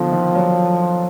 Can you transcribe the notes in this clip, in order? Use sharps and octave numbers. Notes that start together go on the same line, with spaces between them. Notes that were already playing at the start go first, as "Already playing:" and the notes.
Already playing: B2 D3 D#3 F3
D#3
F#3